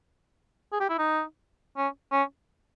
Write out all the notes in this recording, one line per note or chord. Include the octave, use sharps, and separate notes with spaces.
G#4
G4
E4
D#4
C#4
C#4